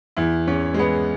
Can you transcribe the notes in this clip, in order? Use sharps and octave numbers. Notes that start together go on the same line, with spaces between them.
E2 E4
E2 C#4
G#3
E2 B3